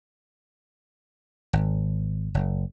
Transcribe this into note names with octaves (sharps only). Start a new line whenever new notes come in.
G#1
F#1